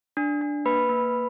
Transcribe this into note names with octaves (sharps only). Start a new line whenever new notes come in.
D4
D4
A#3 B4 B5
A#3